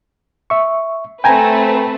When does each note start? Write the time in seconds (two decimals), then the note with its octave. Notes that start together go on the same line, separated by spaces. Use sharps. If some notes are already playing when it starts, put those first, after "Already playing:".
0.50 E5 C#6
1.24 A3 C4 B4 G5 G#5 A#5